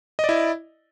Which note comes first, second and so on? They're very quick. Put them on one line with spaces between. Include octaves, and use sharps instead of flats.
D#5 D5 E4